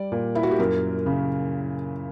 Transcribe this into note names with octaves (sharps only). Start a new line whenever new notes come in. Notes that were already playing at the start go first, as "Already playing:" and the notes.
Already playing: G3 D5
A#2
E4
F#4
G4
F#2 A#4
C#3